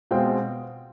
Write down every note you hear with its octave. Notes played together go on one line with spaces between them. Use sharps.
B2 G#3 C4 F5 G5